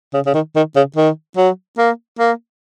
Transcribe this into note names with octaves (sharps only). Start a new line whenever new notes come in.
C#3
C#3
D#3
D#3
C#3
D#3
F#3
A#3
A#3